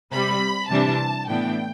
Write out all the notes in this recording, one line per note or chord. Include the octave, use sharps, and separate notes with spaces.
C3 G3 C4 B5
C3 E3 G3 D4 A5
A2 E3 B3 D4 G5